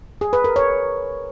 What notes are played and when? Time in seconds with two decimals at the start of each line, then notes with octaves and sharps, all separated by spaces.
0.21 G#4
0.33 B4
0.44 A#4
0.56 C#5